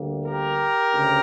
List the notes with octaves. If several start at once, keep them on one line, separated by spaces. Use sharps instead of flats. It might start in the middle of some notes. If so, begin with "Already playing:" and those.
Already playing: D2 D3 G3 A#3
G4 A#4
D2 C#3